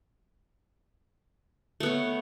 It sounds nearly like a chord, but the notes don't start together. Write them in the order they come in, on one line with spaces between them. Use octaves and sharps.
A3 B3 C#5